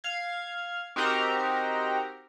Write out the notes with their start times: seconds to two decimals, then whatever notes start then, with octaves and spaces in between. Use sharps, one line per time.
0.04 F5 G#6
0.96 C4 D#4 F#4 G4 A#4 A#5